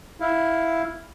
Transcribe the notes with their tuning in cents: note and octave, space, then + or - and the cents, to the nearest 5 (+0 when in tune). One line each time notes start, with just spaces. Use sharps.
E4 +0 F5 +0